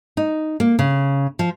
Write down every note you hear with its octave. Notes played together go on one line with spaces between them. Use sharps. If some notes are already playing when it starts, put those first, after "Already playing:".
D#4
A#3
C#3
F3